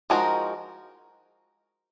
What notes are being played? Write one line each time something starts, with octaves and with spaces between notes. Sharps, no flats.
F3 G#3 D#4 F#4 A#4